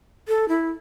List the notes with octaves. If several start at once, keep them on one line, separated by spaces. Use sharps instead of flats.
A4
E4